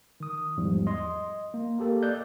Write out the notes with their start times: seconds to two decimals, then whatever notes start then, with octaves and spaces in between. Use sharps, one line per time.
0.20 D#3 D#6
0.57 E2 G#2 F3 G3
0.87 D#5 C6
1.54 A#3
1.79 A#3 G4 A4 A#4
2.03 D5 D#5 F#6 G6